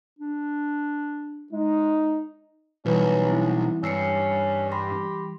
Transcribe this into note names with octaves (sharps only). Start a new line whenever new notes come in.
D4
G#3 D#4
B1 E3 G3 C#4 G4 B4
C4 E4
G2 C#4 E6 C7 C#7
G4 B5 C6 A#6